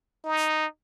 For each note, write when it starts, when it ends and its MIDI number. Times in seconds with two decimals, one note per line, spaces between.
0.24 0.66 63